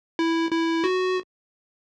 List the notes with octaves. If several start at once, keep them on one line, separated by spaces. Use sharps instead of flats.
E4
E4
F#4